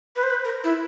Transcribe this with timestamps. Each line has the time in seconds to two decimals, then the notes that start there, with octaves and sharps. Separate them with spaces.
0.16 B4
0.23 C5
0.30 B4
0.44 A#4
0.64 E4